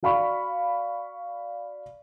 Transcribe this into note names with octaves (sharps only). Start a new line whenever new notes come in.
F#4 D5 F5 B5 C#6